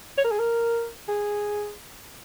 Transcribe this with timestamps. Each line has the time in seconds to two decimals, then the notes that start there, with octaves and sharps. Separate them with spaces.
0.17 C#5
0.24 A#4
0.31 G#4
0.39 A#4
1.08 G#4